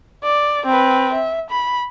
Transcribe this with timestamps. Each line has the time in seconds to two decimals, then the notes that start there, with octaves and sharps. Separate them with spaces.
0.23 D5
0.66 C4 B4
1.14 E5
1.50 B5